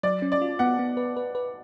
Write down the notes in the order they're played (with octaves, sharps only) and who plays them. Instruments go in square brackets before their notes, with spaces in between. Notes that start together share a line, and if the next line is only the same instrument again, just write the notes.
[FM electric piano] F#3 [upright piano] D5
[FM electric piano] C#4
[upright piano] D5
[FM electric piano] F4
[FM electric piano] B3 [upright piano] F#5
[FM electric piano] B3
B4
B4
B4